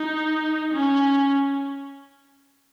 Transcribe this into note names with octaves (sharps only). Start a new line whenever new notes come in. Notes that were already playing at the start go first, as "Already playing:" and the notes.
Already playing: D#4
C#4